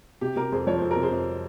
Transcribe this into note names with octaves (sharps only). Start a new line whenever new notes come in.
C3 G4
C3 G4 A#4
F2 G#4 C5
F3 C#5
F2 C5
A#4
C3
G#4 C5
F2